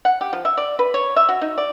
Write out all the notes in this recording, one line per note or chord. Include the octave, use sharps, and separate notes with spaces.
F#5
G4
F3
E5
D5
B4
C#5
E5
F#4
D#4
D5